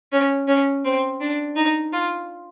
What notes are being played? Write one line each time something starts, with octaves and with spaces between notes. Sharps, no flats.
C#4
C#4
C4
D4
D#4
F4